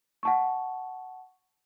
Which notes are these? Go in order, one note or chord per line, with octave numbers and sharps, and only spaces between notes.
F#5 A5 C#6